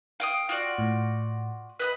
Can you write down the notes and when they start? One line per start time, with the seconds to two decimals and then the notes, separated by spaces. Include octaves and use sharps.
0.20 F5 G5 D#6
0.49 F4 F#4 D5
0.78 A2
1.80 B4 D#5 B5